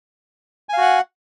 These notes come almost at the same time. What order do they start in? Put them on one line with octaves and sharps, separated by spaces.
G#5 F5 F#4 F#5